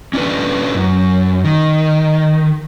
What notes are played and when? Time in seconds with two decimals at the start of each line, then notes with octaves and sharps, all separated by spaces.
0.14 C#4 D4 E4 B4
0.75 F#2
1.45 D#3